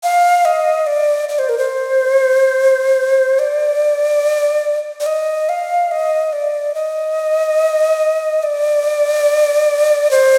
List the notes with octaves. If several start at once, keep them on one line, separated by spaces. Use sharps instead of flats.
F5
D#5
D5
D5
C5
A#4
C5
D5
D5
D#5
F5
D#5
D5
D#5
D5
C5